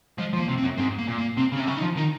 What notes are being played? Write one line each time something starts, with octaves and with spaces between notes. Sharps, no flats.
F3 G#3
F3
A#3
C3
C4
F#2
G#2 C4
A#3
A#2
A#3
C3 C4
C#3
C#4
C3
C#3 C#4
D#4
F3
D#3 D#4